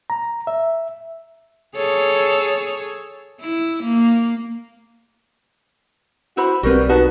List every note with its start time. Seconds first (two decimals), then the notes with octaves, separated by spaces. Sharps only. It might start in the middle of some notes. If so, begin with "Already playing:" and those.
0.10 A#5
0.47 E5
1.76 G#4 A4 C#5
3.41 E4
3.84 A#3
6.37 E4 F#4 C5 B5
6.63 B1 G3 C4 F#4 A#4 B4
6.89 D#4 F#4 B4 A5